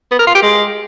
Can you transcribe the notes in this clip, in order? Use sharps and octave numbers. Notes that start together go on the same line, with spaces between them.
B3
A#4
F4
G4
G#3